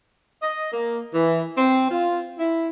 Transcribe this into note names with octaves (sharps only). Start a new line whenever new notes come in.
D#5
A#3
E3
C4
F4
E4